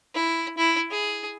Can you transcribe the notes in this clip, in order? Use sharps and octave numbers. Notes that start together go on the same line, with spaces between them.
E4
E4
G#4